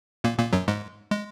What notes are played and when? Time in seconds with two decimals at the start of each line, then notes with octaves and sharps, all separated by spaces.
0.24 A#2 A#3
0.39 A#2 A#3
0.53 F#2 F#3
0.68 G#2 G#3
1.11 G#3